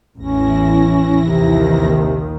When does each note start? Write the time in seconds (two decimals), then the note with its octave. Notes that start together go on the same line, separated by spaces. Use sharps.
0.18 A1 E2 E3 C#4 E4 A#6
1.25 A#1 D#2 C3 D#3